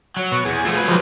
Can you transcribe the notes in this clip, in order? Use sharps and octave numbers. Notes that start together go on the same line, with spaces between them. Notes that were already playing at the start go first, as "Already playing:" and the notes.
F#3
B2 C#6
E2 G#4
F3 A3 F4
F#3 B4
F3 G3